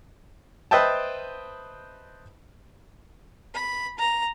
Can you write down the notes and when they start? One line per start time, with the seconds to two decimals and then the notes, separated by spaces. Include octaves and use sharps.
0.71 B4 C5 D#5 E5 G5 A5
3.54 B5
3.99 A#5